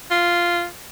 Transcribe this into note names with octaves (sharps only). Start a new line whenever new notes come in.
F4